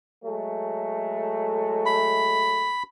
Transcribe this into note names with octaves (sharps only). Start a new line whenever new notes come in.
F#3 G#3 A3
B5